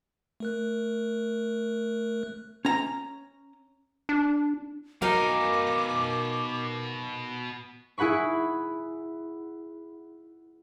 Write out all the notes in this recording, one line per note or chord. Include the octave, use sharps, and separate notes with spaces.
A3 A#4 F#6
C#4 A#5
D4
B2 F#3 D#4 A#4 F5 G#5 D6
E4 G#4 F#5 B5 C#6